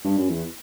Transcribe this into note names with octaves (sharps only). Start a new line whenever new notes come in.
G2
F#2
E2